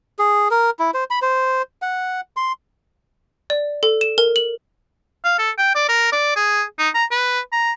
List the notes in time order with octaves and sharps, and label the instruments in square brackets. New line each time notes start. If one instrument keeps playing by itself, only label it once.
[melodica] G#4
A#4
E4
C5
B5
C5
F#5
C6
[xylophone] D5
A4
E7
A#4
F#7
[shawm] F5
A4
G5
D5
A#4
D5
G#4
D#4
A#5
B4
A#5